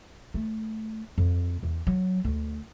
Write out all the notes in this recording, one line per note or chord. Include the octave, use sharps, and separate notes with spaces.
A3
F2
E2
F#3
D2